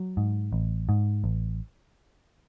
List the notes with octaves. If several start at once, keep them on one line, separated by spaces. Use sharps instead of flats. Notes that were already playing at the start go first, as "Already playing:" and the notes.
Already playing: F#3
G#2
A1
G#2
A1